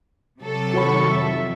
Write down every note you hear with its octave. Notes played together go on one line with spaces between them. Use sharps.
C3 F#3 A4
D#3 F#4 C#5 B5 C#6
F2 E5